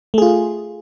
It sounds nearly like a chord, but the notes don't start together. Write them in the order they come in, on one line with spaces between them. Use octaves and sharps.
A3 G#4 F4